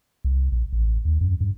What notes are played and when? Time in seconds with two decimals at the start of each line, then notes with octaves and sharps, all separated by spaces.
0.24 C2
0.52 A#1
0.73 A1
1.05 D#2
1.21 F#2
1.41 G2